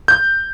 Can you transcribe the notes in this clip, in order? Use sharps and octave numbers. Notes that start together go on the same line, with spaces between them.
G6